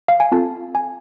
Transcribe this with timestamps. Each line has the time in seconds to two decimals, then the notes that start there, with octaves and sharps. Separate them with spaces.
0.08 F5
0.20 G#5
0.32 C4 F4 A4 A5
0.75 G#5